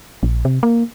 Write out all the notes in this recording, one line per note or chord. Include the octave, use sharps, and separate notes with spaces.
A#1
C3
A#3